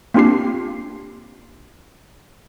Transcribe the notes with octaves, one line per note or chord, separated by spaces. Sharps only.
A#3 C4 D4 F4 G4 C7